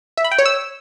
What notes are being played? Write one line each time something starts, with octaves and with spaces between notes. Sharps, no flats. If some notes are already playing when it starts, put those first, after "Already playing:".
E5
B5
G5
C#5
E6